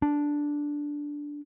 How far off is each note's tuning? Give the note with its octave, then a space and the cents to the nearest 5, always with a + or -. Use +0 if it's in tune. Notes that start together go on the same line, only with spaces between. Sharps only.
D4 -5